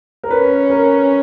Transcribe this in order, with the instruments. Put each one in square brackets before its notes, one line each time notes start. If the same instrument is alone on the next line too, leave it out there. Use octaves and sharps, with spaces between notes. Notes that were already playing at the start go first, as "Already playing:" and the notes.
[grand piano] A#4
[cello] C#4 [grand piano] B4
[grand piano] A#4